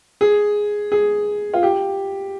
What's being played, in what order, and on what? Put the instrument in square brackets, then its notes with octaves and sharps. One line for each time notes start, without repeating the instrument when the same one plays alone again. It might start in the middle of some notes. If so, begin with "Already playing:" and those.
[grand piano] G#4
G#4
F4
G4